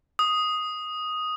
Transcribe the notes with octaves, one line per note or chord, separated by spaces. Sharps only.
D#6